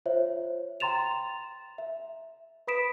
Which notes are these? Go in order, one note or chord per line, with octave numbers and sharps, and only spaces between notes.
F4 C5 C#5 E5
G5 A#5 C6 A6 E7 F7
E5
B4 B5 D#6 B6 D7 E7